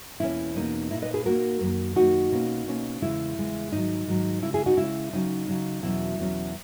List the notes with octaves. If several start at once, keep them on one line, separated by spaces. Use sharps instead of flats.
E2 B2 A#3 C#4 E4
E2 B2 A#3 C#4 D#4
A#2 A#3 D#4 E4
B4 D#5
G#4 B4
A#2 A#3 D#4 F#4 A#4
F#2 D#3 A#3
F#2 D#3 A#3 D#4 F#4
B2 A#3 C#4
B2 A#3 C#4
E2 C#3 G#3 E4
E2 C#3 G#3
G#2 D#3 F#3 D#4
G#2 D#3 F#3
C#3 G#3 C#4 E4
E4 G#4
D#4 F#4
C#3 G#3 C#4 E4
C#3 F#3 C#4 D#4
C#3 F#3 C#4
E2 B2 F#3 C#4 E4
E2 B2 F#3 C#4